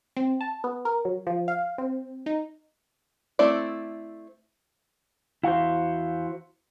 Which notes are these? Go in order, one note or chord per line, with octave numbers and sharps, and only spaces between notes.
C4
A5
B3
A#4
F#3
F3
F5
C4
D#4
A3 C4 E4 D5
E2 E4 F#4 C5 F5